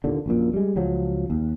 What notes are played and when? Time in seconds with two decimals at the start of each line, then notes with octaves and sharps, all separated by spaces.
0.04 D#2 A#2 D3
0.26 A#1 F#2 A#2
0.54 G3 G#3
0.76 C#2 F3 F#3
1.30 D#2